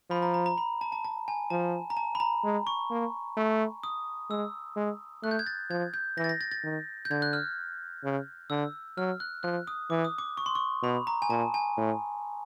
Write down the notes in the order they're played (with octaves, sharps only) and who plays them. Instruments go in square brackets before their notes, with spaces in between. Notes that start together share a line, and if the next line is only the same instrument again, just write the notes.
[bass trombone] F3 [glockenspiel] B5
[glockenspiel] A#5
A#5
A#5
B5
A5
A5
A5
G#5
[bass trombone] F3 [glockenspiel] A5
[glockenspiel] A#5
A5
B5
A#5
[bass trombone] G#3
[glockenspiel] C#6
[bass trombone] A#3
A3
[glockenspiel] D#6
[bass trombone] G#3 [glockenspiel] E6
[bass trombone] G#3
[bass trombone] A3 [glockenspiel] F#6
[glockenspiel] G6
G#6
A6
[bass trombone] F3 [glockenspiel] G#6
[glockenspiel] G6
[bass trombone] E3 [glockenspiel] A#6
[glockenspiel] A6
A#6
A6
A6
[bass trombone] D#3
[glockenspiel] G6
[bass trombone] D3 [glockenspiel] G#6
[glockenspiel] F#6
F6
[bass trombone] C#3
[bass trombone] D3 [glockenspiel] E6
[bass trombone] F#3 [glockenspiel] F6
[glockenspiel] F#6
[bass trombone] F3 [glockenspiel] F#6
[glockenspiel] D#6
[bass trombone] E3 [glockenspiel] D6
[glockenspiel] D#6
D6
C#6
C6
C#6
[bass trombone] B2 [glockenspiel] B5
[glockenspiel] A#5
G#5
[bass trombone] A#2 [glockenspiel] A5
[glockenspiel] G#5
[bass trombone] A2